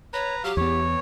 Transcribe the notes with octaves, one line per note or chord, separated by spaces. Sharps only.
B4 C#5 A#5
F#3 G4 F5
E2 B3 C#5